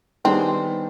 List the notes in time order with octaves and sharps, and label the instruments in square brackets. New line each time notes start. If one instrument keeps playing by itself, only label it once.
[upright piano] D#3 G3 B3 D4 G#4 [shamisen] C4